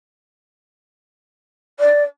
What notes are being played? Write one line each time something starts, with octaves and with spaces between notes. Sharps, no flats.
D5